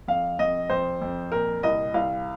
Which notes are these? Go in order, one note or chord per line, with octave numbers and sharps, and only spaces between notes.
F2 F5
F2 D#5
F2 C5
F2
A#2 A#4
C2 D#5
C2 F5